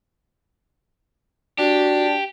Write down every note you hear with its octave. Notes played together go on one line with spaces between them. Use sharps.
D4 F#4 G4